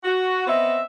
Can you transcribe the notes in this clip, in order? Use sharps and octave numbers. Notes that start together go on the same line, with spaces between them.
F#4
B3 C4 D#5 E5